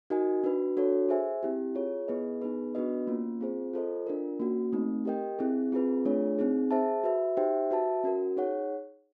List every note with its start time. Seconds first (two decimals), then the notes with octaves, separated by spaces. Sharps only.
0.10 D#4 F#4 A#4 D#5 G#5
0.44 D4 F#4 B4
0.77 D4 F#4 A4 C#5
1.09 G#4 C5 E5 G#5
1.43 C4 E4 G4
1.75 F4 G#4 C#5
2.08 B3 E4 G#4 B4 D#5
2.42 B3 D#4 G#4 B4
2.75 B3 D4 F#4 B4 D#5
3.07 A#3 C#4 F4
3.41 C4 F4 G#4 C5
3.73 F4 A4 C5 D#5
4.07 D4 F4 A#4
4.40 A#3 C#4 F#4
4.72 A3 C4 D#4
5.05 G4 A#4 D#5 G5
5.39 C4 E4 G#4
5.72 C4 F4 G#4 B4
6.05 A3 D4 F4 G#4 C#5
6.39 C4 D#4 G#4
6.71 G#4 C5 E5 A5
7.04 F#4 B4 E5
7.37 D#4 G4 C5 E5 G5
7.71 F#4 B4 E5 A5
8.04 C#4 F#4 A#4
8.37 D#4 G#4 C#5 F#5